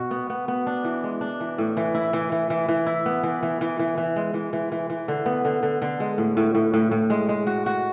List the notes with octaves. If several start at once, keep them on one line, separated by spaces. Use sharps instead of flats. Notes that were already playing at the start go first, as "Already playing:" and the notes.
Already playing: B2 F#4
B3
B3
B3
D4
E3
G#3
D4
E3
A2
E3
E4
E3
E3
E3
E3
E4
B3
E3
E3
E3
E3
E3
G#3
E3
E3
E3
E3
D3
B3
D3
D3
D3
G#3
A2
A2
A2
A2
A2
G#3
G#3
F#4
F#4